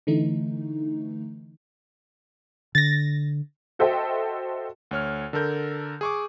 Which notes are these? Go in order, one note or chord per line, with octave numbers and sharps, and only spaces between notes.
D3 E3 A3 D#4
D3 A6 A#6
F#4 A4 C5 D#5 E5 G5
D2 C#5 F6
D3 A4 A#4 G6
G#4 C#6 D6